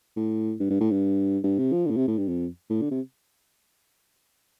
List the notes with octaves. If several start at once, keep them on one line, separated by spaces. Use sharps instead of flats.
A2
G2
G2
A2
G2
G2
C3
F3
D3
A2
C3
A2
G2
F2
A2
D3
C3